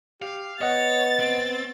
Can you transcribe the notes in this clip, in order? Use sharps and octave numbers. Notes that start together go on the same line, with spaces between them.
G4 F5
B3 C#5 D#5 F#5 A6
C4